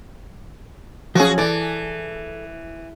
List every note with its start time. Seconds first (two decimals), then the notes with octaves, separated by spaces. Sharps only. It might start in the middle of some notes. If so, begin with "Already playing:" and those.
1.15 F3 F#3 C#4 F#4 G#4
1.38 E3 A4 D5